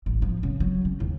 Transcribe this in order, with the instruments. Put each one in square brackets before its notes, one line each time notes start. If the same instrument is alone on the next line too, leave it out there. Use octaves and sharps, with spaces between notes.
[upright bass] A1
F3
C#3
F#3
C#3
D#2